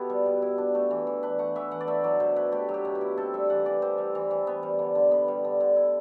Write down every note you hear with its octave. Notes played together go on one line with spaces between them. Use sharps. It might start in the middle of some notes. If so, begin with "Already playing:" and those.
Already playing: B2 B3 E4 G4 A4 B4
G3
B2
E4
D4
A3
E3
E3
D4 B4
A3 F#5
E3 E5
E3 F#5
D5
A3 E5
F#3 D5
B2 C5
E4 B4
A3 G4
F#3
G4
B2
G4
E4
C4 A4
G3 E5
E3 F#5
E3 D5
C4 C5
G3
E3
E3
B3
G3
D3
D3
B3 B5
G3
D3
D3
E4